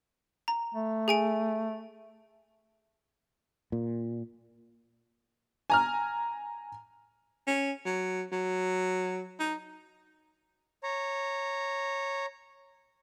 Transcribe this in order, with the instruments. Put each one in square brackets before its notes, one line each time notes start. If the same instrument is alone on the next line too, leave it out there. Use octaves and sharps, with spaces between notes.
[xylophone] A#5
[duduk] A3
[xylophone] G#4 G#5 D7
[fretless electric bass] A#2
[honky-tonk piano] G#5 A#5 F6
[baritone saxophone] C#4
F#3
F#3
D#4
[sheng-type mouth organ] C#5 A#5